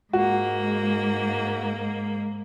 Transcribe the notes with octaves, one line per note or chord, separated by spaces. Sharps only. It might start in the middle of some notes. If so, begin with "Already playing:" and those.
G#2 G#3 A#3 F#4